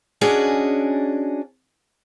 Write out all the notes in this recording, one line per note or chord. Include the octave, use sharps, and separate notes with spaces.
C#4 D4 F#4 G#4 D5 D#5